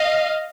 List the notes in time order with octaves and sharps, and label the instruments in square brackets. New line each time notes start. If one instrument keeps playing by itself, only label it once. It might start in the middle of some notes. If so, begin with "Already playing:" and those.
Already playing: [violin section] D#5 F5